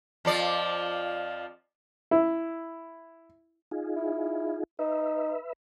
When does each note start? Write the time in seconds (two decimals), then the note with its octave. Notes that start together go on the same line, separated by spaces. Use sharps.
0.25 F2 F3 D5
2.11 E4
3.72 D#4 F4 G#4
3.96 E4
4.79 D#4 B4 E5